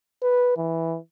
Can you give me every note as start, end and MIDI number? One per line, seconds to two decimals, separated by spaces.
0.22 0.54 71
0.57 0.97 52